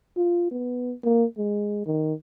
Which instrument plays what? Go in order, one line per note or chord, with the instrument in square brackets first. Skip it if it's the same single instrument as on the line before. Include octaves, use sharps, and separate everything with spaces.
[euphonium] F4
B3
A#3
G#3
D#3